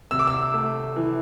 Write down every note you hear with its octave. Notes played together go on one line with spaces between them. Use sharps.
C3 E6
D6
E6
A3
E3